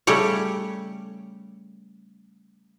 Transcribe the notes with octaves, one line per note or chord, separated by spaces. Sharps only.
C#3 G3 A3 G4 C#5